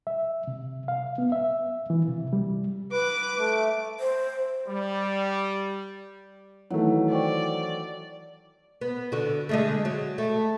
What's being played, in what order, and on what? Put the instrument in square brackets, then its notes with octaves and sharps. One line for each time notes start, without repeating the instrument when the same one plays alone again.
[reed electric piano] E5
C3
F5
B3
E5
E3
C3
G3
[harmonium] B4 [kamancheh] D6
[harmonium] A3
[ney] C5
[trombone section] G3
[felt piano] D#3 E3 A3 [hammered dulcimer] F#3 [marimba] E4
[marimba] C5 G5 C#6 [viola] D5
[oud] B3
D3 F#4
D3 G#3 A3
F#3
A3